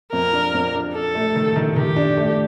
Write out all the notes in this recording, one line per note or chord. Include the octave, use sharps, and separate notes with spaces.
F2 A#4
D4
F2
D4
D4 A4
A3
D#3
D#3
D#3 G4
D4
A3